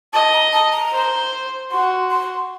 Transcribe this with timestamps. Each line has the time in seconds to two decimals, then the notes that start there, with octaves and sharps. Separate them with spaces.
0.13 D#5 A5
0.33 A#5
0.53 A5
0.72 A#5
0.93 C5
1.71 F#4 C6
2.11 C6